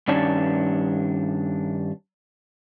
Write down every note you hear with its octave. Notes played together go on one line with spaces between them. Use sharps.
G2 D#3 C#4 D4 C#5 A5